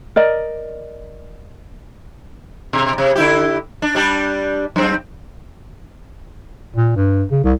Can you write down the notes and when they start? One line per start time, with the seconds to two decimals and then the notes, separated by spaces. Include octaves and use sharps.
0.16 A#4 D5 D#5
2.73 B2
2.98 C3
3.16 D3 E4 G4
3.82 D4
3.95 G3 D4 G4
4.76 F#2 C4
6.76 A#2
6.96 G2
7.32 C#3
7.44 C2